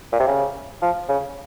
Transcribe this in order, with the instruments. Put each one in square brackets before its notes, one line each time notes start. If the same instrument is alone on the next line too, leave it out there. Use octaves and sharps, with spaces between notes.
[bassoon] A#2
C3
C#3
F3
C#3